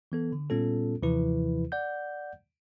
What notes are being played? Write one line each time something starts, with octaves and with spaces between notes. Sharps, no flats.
E3 B3 A4
D3
A#2 G3 B3 C#4 F4 A4
D#2 C3 E3 F3 E4 B4
D5 F#5 G6